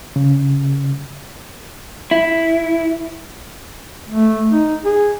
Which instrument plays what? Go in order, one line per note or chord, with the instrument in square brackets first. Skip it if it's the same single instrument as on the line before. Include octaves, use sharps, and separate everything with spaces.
[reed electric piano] C#3
[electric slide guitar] E4
[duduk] A3
D#4
G#4